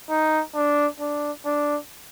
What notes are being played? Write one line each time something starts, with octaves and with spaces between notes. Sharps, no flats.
D#4
D4
D4
D4